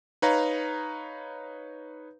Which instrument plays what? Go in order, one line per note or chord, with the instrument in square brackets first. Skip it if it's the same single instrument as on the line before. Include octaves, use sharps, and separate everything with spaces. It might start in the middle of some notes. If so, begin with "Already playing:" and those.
[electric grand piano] D#4 B4 C#5 F5 A#5